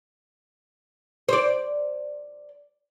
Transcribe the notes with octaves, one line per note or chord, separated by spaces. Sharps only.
C5 D5